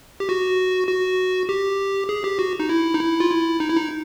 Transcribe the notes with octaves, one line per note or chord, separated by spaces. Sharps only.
G4
F#4
F#4
G4
G#4
G4
F#4
D#4
E4
D#4
E4
F4
E4
D#4
E4
D#4